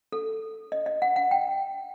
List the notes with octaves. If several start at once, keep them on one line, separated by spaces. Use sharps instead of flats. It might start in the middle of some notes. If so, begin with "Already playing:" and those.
A4
D#5
D#5
F#5
F#5
G5